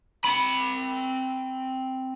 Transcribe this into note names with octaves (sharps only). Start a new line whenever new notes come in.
C4 B5